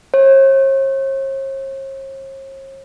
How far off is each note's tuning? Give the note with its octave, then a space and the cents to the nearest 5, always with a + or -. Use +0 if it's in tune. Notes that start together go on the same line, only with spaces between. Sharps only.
C#5 -45